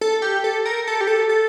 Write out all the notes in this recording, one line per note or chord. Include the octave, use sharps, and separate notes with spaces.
A4
G4
A4
A#4
A4
G4
A4
A4